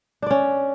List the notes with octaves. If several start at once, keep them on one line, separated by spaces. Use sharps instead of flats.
C#4 D4 D5